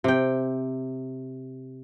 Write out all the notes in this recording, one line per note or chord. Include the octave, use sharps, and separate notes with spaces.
C3 G5